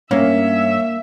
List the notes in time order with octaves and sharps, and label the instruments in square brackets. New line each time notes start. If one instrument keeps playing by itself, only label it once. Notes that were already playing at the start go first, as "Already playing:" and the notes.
[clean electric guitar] G2 [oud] A#3 [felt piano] C#4 [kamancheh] E5